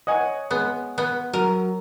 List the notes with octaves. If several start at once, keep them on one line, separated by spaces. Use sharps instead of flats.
C#5 D#5 F#5 G#5 D#6
G#3 B3
B3
F#3 A#4